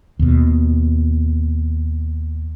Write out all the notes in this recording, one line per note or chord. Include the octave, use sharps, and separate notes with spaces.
D#2 B2